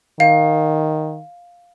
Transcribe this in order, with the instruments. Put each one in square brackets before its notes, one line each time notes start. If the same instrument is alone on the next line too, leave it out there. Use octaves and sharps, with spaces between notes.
[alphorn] D#3 [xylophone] F5